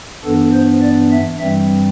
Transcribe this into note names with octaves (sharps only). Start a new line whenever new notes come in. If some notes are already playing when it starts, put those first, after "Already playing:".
G2 E3 B3 D4 A4
C5
D5
E5
G2 E3 G3 C4 E5